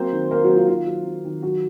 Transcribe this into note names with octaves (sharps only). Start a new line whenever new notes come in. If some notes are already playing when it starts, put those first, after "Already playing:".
Already playing: F#3 A#3 C4 C5
D#3
A#3 A#4
F#3 F#4
A#3
F4
D#3 F4
F#3
D#3
D#3
F#3 F#4